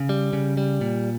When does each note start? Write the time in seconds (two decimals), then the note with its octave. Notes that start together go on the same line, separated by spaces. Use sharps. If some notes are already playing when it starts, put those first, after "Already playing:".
Already playing: C#3
0.09 G3
0.33 C#3
0.57 G3
0.81 A#2